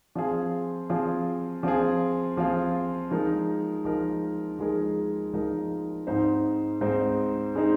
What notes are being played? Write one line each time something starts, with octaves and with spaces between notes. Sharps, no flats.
F3 C4 F4 G#4
F3 C4 F4 G#4
F3 C4 F4 G#4
F3 C4 F4 G#4
F3 G#3 D#4 A#4
F3 G#3 D#4 A#4
F3 G#3 D#4 A#4
F3 G#3 D#4 A#4
G#2 G#3 C4 D#4 C5
G#2 G#3 C4 D#4 C5
G#3 C4 D#4 C5